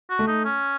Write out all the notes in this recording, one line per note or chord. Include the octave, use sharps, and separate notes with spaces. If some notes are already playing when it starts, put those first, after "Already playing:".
F#4
A3
D#4
C#4